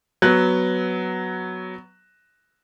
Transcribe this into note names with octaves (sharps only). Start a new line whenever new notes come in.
F#3 B3 F#6